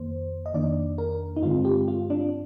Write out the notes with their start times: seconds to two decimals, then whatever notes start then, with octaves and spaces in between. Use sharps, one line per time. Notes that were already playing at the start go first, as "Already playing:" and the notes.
Already playing: F2 D#3 A#3 C5
0.46 D#5
0.53 F2 D#3 A#3 D4 D5
0.98 A#4
1.36 D#4
1.43 G2 D3 G#3 C4 F4
1.65 G4
1.88 F4
2.10 D4